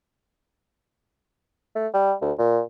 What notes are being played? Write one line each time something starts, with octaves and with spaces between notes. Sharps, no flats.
A3
G3
D2
A#2